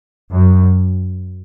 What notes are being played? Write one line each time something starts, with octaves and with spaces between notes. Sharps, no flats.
F#2